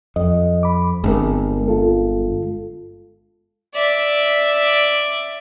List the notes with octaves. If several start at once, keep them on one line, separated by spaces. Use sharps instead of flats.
F2 D#5
B5 D6
G1 G#3 C4 A#4
G#3 F4 A4
D5 E5